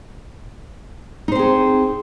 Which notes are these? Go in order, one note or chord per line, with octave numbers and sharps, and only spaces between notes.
C4 D#4 G#4 C5